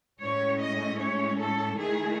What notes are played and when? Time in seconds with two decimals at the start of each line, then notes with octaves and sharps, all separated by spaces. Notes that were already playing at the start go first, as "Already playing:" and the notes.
0.20 A2 G#3 C#4 C#5
0.60 D#5
0.99 C#5
1.40 A4
1.78 D#3 A3 E4 G#4